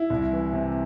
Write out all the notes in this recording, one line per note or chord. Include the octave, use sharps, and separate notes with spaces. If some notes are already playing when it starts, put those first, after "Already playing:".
Already playing: E4
C2
E3
C3